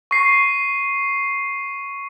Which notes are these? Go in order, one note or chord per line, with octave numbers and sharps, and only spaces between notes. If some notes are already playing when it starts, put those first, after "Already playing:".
C#6 C7